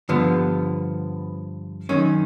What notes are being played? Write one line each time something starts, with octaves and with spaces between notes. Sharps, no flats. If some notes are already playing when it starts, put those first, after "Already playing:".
G2 D3 F3 B3
F#2 D#3 C#4